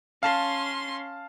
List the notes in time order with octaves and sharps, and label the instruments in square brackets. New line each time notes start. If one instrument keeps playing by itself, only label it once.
[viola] C#4 C6 [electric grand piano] F5 A5